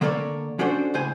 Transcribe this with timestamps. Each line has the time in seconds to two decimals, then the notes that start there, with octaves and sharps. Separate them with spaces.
0.01 D3 A#3 A4 A#4 C#5 D5
0.59 C#4 D4 F#4 A4 C5
0.94 C#2 A2 C5 G#5